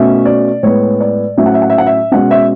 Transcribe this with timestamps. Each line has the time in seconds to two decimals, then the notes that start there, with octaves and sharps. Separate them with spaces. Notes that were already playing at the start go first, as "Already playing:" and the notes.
Already playing: B2 A3 C#4 E5
0.25 D5
0.63 A2 G#3 B3 C#5
1.00 D5
1.37 A2 F#3 C#4 E5
1.46 F#5
1.54 E5
1.62 F#5
1.70 E5
1.78 F#5
1.87 E5
2.12 B2 G#3 C#4 F#5
2.31 E5